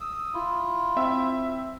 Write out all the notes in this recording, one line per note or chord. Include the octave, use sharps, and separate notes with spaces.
D#6 E6
E4 F4
C4 E5